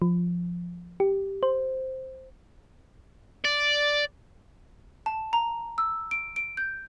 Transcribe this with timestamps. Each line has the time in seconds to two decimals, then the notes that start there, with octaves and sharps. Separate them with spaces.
0.02 F3
1.00 G4
1.43 C5
3.44 D5
5.06 A5
5.33 A#5
5.78 E6
6.11 D7
6.36 D7
6.57 G6